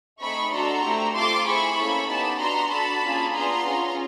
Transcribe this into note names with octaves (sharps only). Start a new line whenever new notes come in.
A3 C4 D#4 G#4 B5 C#6
D4 F#4 A4 A#5 C6
A3 C4 E4 G4
C4 F4 A4 C6 D6
C4 E4 G#4 B5 C#6
A#3 C#4 E4 A4
B3 D#4 G4 A5 B5
B3 D4 F#4 A#5 C6
D4 F#4 A4 A5 B5
A#3 C#4 F4 G#4
B3 D4 F4 G#4 A#5 C6
C#4 F4 G#4